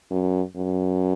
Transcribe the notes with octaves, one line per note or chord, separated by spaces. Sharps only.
F#2
F#2